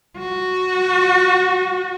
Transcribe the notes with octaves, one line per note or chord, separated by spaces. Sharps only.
F#4